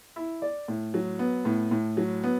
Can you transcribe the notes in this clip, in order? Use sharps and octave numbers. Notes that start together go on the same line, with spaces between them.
E4
D5
A2
F#3
B3
A2
A2
F#3
B3